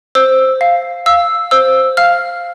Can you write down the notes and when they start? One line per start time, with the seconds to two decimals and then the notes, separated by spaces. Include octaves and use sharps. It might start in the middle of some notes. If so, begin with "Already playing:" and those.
0.15 C5 E6
0.61 F5
1.06 F5 E6
1.51 C5 E6
1.97 F5 F6